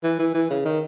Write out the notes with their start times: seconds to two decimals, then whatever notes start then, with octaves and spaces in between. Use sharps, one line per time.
0.03 E3
0.19 E3
0.34 E3
0.50 C#3
0.65 D#3